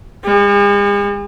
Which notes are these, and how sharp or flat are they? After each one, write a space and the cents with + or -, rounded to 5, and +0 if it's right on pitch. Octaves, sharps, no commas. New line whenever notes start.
G#3 -45